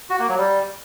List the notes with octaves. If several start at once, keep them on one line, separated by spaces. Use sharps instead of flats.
F#4
A#3
F#3
G3